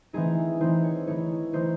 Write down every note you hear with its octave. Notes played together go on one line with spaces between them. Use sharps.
E3 A3 C4 D#4 G#4
E3 A3 C4 D#4 C5
C#5
E3 A3 D#4 C#5
E3 A3 D#4 C5